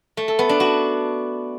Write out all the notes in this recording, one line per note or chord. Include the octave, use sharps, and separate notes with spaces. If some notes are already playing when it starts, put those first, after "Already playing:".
A3
A4
B3
D4
F#4